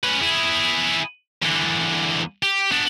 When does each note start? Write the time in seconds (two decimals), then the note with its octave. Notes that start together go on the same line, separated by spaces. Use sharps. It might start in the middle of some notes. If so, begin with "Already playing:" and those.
0.03 C#4 B4
0.20 E4 G#4
1.42 E2 D3
2.43 G4
2.72 B3 D4